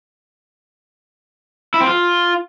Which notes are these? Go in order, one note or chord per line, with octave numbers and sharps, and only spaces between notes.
E4
C4
F4